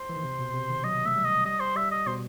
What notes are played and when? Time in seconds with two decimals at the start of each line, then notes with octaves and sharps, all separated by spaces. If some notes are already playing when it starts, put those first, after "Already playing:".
Already playing: C5
0.09 E3
0.16 D#3
0.24 C3
0.39 B2
0.54 C3
0.69 D#3
0.84 F#3 D#5
1.05 A3 E5
1.15 G3
1.25 D#5
1.45 G3 D#5
1.60 C5
1.76 G3 E5
1.91 D#5
2.07 B2 C5